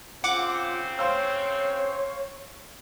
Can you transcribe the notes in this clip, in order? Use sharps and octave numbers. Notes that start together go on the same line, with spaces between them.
C#3 C4 F4 F#5 D6
C5 C#5 F5 E6